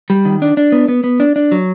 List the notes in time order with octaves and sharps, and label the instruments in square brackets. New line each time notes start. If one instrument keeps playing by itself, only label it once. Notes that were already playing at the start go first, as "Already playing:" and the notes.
[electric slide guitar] G3
D#3
D4
D4
B3
B3
B3
D4
D4
F#3